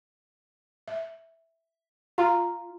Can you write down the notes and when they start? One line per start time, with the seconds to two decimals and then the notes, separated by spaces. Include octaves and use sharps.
0.88 E5
2.18 F4 A#5